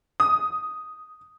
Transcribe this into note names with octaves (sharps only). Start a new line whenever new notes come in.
D#6